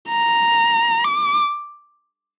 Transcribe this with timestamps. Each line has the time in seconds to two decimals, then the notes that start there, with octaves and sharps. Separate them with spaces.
0.10 A#5
1.05 D6